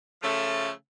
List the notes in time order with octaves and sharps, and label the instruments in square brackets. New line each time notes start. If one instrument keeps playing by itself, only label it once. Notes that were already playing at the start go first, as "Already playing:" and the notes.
[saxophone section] C#3 F3 A3